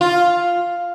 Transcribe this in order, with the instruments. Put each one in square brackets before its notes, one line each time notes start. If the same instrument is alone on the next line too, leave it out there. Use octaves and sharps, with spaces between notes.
[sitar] F4